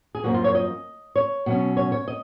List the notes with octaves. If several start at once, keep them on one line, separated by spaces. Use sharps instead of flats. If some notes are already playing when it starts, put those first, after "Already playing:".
G#4
F#2 F3 A#3 C#4 F#4
F4
C#5
D#5
C#5
B2 F#3 C#4
C#5
C#5
D#5